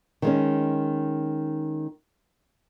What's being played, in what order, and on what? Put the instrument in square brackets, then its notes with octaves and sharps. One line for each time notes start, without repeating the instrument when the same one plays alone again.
[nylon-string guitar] D#3 G#3 C#4